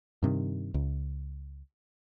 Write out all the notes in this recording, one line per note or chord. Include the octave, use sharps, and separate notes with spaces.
G2 C3 D#3
C#2